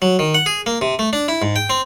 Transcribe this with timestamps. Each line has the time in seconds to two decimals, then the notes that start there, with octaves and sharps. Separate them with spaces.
0.02 F#3
0.19 D#3
0.35 F#5
0.46 G#4
0.66 A#3
0.81 C3
0.99 A3
1.13 D4
1.28 E4
1.42 G#2
1.56 G5
1.70 C4